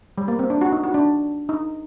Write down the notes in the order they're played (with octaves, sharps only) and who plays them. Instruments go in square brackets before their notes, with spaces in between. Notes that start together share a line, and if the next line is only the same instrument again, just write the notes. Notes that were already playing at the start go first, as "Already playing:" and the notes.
[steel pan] G3
A#3
C4
D4
F#4
D#4
F#4
D4
D#4